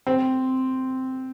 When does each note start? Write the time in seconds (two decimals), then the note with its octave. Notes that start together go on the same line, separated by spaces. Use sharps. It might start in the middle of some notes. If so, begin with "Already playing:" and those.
0.07 C4